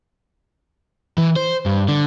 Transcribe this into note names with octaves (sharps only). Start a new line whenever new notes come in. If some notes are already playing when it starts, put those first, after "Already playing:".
E3
C5
G2
D3